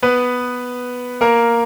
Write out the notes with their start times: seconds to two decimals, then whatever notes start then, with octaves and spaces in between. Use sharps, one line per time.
0.02 B3 B4
1.21 A#3 A#4